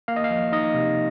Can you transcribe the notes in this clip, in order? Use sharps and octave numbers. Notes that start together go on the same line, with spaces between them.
A#3 F5
D#5
F5
F3
D#4 D#5
C3